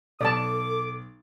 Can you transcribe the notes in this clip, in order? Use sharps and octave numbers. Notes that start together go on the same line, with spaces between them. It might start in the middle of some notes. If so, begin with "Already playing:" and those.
B1 A4 D5 A5 D6 D#6